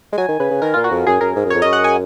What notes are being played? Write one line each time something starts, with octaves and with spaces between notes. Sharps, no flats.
G#3
F#3 G#5
D#3
C#3 B4
C#3
D#3 A#4
A#2 F4
F#4
F2
F#2 G#4
F#2 A#4
G#2
F#2
F2 C#5
F#2 D#5
F#5
G#5